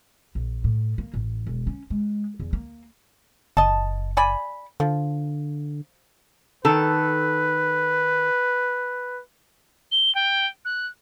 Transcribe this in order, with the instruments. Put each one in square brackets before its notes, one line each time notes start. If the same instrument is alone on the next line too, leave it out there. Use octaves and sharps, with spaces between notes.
[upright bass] A#1
A2
A#3
A1
E1
C#4
G#3
E2
A#3
[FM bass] F#1 [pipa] D#5 A5
[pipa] D5 G#5 B5
[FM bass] D3 [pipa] F3
[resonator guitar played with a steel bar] D#3 A4 [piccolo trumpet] B4
[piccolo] G7
G5
F#6